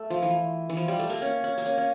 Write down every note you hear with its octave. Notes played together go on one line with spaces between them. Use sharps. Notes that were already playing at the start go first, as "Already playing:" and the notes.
Already playing: A3
F3
E3
E3
F3
G3
A3
A#3
C#4
C#4
A#3
C#4
C#4